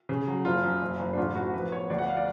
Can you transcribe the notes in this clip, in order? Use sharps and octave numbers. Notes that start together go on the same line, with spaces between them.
C#3
F#3
F#1 F4
F#2
F#1
F#1
D4
A1 F4
A1 F#4
F3 B4
B3 C#5
D2 D5
F#5
F5
D5